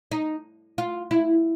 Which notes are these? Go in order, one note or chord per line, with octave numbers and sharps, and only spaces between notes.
D#4
F4
E4